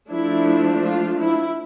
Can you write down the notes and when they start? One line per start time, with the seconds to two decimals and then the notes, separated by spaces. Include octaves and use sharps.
0.11 F3 A3 D4 E4
0.83 F4
1.20 E4